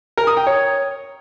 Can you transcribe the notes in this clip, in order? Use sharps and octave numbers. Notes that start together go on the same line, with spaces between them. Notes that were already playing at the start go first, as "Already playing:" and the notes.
A#4
D#6
G5
C#5